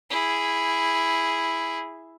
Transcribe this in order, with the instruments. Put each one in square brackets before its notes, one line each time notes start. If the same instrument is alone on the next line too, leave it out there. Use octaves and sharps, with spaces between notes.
[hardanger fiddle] E4 G#4